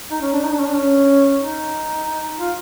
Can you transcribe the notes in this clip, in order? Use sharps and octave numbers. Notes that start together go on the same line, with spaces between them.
D#4
C#4
D4
D#4
D4
C#4
D4
C#4
D#4
F4